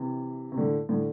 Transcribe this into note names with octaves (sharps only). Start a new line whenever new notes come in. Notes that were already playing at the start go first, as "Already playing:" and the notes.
Already playing: C3 E3
C3
A2 D3
A2 D3